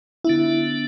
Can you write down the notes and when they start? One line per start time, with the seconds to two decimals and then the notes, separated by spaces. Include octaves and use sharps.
0.24 D3 B3 D4 E4